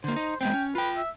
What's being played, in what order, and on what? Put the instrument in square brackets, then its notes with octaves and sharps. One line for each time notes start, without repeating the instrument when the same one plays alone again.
[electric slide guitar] D3 A#3 [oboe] C5
[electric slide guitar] D#4
[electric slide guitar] G#3 B3 C4 [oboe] G5
[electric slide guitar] C#4
[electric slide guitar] F4 G5 [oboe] B4
[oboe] E5